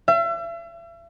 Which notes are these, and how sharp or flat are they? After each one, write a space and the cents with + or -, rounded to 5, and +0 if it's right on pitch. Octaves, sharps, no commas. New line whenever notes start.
E5 +40